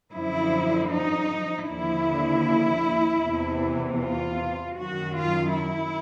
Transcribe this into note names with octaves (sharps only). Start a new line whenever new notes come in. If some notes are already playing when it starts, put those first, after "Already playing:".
F#2 D3 F3 E4
D#4
D#2 D3 F3 E4
E2 C3 E3
F4
F#2 D#3 F#4
F4
E4